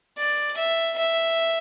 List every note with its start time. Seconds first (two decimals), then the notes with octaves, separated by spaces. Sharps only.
0.18 D5
0.57 E5
0.98 E5